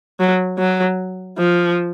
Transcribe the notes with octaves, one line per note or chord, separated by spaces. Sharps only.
F#3
F#3
F3